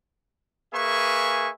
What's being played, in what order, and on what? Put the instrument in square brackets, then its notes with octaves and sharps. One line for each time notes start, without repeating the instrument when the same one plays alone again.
[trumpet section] A#3 G#4 B4 E5 G#5 C#6